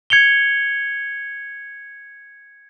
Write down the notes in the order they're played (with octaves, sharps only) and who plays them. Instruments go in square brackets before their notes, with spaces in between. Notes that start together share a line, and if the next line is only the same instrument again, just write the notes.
[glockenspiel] G#6 C#7 F7 G7